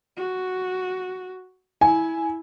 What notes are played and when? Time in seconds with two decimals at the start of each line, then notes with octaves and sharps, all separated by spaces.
0.17 F#4
1.81 E4 G#5